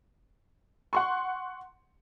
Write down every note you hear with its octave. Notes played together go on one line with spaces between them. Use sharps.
F#5 C6 C#6